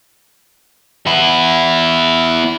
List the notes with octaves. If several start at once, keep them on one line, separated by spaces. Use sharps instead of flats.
B3 E4